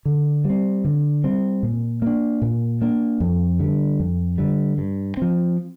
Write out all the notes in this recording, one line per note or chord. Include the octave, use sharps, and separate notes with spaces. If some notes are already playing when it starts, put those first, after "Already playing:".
D3
G3
C4
D3
G3 C4
A#2
A#3 D4
A#2
A#3 D4
F2
D3 G3
F2
D3 G3
G2
F3 C4